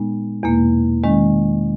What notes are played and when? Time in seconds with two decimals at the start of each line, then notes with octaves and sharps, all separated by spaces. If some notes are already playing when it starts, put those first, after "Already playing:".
Already playing: A#2 G#3 B3 D#4
0.43 E2 B2 A#3
1.04 D#3 G#3 C#4